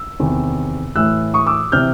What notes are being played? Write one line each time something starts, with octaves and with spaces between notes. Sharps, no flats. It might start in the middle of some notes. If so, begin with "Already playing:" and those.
Already playing: E6
E2 C3 D#3
A2 E3 E6 F#6
C#6 D#6
D6 E6
C3 E3 F6 G6